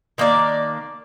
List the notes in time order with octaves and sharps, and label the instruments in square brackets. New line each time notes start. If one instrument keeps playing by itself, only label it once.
[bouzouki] D#3 A#3 D4 D5